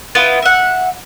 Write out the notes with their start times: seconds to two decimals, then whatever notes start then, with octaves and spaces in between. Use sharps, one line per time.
0.15 B3 E4 F4
0.42 E5 F#5